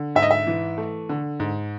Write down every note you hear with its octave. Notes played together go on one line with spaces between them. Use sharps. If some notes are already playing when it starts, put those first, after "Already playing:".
Already playing: D3
G#2 E5
D#5
E5
E3
A3
D3
G#2